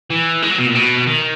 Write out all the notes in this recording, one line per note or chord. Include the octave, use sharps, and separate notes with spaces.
E3
G#3
F#3
B2
A#2
B2
D#3